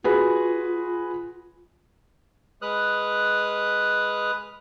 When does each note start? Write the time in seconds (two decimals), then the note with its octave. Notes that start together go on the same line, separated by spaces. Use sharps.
0.04 F4 F#4 G#4 B4
2.62 G#3 B4 D#6 F6 F#6